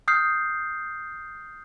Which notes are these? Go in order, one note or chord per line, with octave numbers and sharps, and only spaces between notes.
D#6 F6 G6 C7